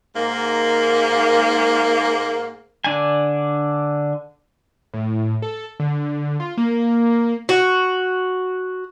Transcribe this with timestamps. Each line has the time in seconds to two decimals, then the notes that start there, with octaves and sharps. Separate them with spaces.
0.16 G#2 A#3
2.84 D3 D4 G#5
4.94 A2
5.42 A4
5.80 D3
6.40 F4
6.57 A#3
7.49 F#4